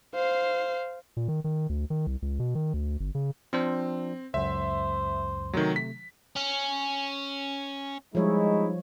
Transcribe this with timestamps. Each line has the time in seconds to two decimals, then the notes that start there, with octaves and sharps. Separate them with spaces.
0.15 C5 F5
1.17 A#2
1.28 D#3
1.44 D#3
1.69 D2
1.90 D#3
2.07 C2
2.22 C#2
2.39 B2
2.55 D#3
2.74 D2
3.00 G1
3.15 C#3
3.53 F3 C4 D4 C5
4.34 C#2 F#2 C5 E5
5.53 C3 D#3 F#3 A3
5.76 B6
6.36 C#4
8.15 F3 G3 G#3 D#4 E4 C#5